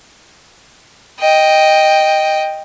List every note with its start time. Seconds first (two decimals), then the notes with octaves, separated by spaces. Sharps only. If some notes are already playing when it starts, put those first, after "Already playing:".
1.20 D#5 G5